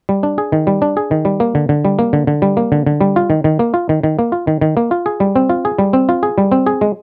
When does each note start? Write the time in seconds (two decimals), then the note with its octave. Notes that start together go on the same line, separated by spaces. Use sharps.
0.09 G3
0.23 D4
0.38 G#4
0.52 D#3
0.67 G3
0.82 D4
0.97 G#4
1.11 D#3
1.25 G3
1.40 A#3
1.55 D3
1.69 D3
1.85 G3
1.99 A#3
2.13 D3
2.27 D3
2.42 G3
2.57 A#3
2.72 D3
2.87 D3
3.01 G3
3.16 F4
3.30 D#3
3.44 D#3
3.59 A#3
3.74 F4
3.89 D#3
4.03 D#3
4.19 A#3
4.32 F4
4.47 D#3
4.61 D#3
4.77 A#3
4.91 F4
5.06 G#4
5.20 G3
5.36 C4
5.50 F4
5.65 G#4
5.79 G3
5.93 C4
6.09 F4
6.23 G#4
6.38 G3
6.52 C4
6.66 G#4
6.81 G#3